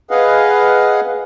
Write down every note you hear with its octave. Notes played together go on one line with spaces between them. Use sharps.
G#4 B4 D#5 F5 F#5